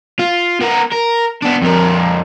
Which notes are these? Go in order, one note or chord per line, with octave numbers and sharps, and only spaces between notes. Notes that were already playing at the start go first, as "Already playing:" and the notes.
F4
B3 A#4
A#4
B3 D4
F2 A#4